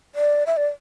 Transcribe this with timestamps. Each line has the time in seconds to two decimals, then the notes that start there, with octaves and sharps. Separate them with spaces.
0.15 D5
0.47 E5
0.57 D5